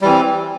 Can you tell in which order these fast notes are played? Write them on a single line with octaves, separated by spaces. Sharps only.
G3 E3 C4